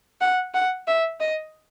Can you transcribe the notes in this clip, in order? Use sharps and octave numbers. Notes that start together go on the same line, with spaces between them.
F#5
F#5
E5
D#5